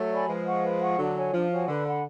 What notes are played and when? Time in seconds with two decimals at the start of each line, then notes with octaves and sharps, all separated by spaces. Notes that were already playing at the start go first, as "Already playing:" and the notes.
Already playing: F#3 A3
0.11 D5 G#5 B5
0.28 F3 G#3 B4
0.46 F#5 C#6
0.63 B4
0.81 F#5 C#6
0.98 D3 F#3 D4
1.15 F#4 C#5 G#5
1.33 F3 D4
1.51 F#4 C#5 G#5
1.68 D3 B4
1.85 F#5 B5